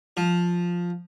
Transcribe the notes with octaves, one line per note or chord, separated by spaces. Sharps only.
F3